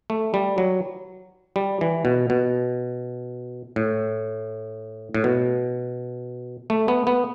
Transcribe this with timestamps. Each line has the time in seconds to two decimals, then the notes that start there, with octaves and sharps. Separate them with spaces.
0.10 A3
0.34 G3
0.58 F#3
1.56 G3
1.81 E3
2.05 B2
2.30 B2
3.76 A2
5.15 A2
5.24 B2
6.70 A3
6.88 B3
7.07 B3